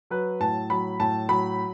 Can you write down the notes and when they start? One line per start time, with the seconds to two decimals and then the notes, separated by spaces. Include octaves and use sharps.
0.11 F#3 B4
0.40 A2 A5
0.70 F#3 B5
1.00 A2 A5
1.29 F#3 B5